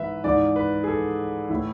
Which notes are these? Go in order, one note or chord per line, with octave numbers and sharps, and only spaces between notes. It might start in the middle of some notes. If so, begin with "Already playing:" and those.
Already playing: G#2 E3 B4 E5
G#2 E3 D5
B4
G#4
A4
A2 E3 E4